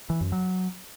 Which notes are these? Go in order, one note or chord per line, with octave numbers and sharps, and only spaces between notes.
E3
F#2
F#3